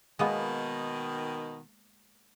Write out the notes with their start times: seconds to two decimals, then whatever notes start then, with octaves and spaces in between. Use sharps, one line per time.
0.19 B2 D#3 G#3 A#3 B3